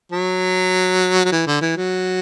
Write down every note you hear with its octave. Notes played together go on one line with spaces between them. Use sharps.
F#3
F#3
E3
D3
E3
F#3